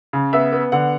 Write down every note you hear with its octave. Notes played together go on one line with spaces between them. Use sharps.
C#3
B3 E5
B3
D3 F#5